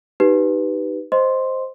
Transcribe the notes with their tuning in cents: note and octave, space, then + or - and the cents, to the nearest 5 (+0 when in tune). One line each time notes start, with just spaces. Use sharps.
D#4 +0 G4 -15 B4 +0
C5 +0 D#5 +0 C6 +0